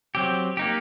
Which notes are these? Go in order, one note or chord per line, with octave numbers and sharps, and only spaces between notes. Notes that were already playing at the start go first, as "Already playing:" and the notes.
F#3 C4 G4
A#3 D#4 G4